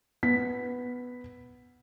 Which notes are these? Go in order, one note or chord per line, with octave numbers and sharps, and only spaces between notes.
B3 B6